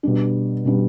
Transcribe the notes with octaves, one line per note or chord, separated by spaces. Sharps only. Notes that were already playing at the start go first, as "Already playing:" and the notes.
B2 G3 D4
B2 G3 D4